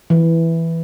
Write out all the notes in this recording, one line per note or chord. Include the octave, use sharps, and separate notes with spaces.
E3